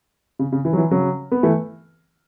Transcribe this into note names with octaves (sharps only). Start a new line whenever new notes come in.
C#3
C#3
E3
F#3
E3
C#3 F#3
B3
E3 A3